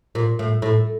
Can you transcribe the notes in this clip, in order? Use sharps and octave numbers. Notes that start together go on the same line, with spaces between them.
A#2
A2
A2